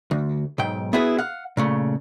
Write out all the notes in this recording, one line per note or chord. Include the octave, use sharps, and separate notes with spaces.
D2
B1 G#2 G5
B3 E4 F#4 G#4 B4
F5 F#5
A#2 C#3 A3